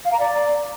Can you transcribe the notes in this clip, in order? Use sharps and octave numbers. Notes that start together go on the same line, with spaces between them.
F5
A#5
D5